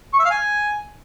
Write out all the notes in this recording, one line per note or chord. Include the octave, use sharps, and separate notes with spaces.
C#6
E5
F5
G#5